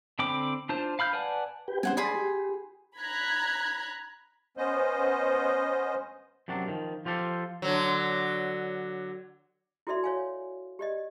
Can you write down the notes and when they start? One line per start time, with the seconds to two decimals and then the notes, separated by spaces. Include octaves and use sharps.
0.19 D3 C4 G5 B5 D6
0.69 D4 F4 C5 A5
0.99 F5 B5 F6 G6
1.13 B4 D5 F#5 G#5 A5
1.68 G4 B4 G5
1.83 G3 B3 C#4 C5 F#5 G#5
1.97 G#4 D5 A5 B5 C6
2.15 G4
2.99 A#5 B5 F#6 G#6
4.57 B3 C#4 C5 D#5
6.48 F#2 C3 F#3 D4
6.67 D#3 F3
7.05 F3 F4 G4 A4 C5
7.62 D3 F#3
9.87 E4 F#4 A4 D5 E5 C6
10.04 C#5 F5 G#5
10.79 G4 D5 D#5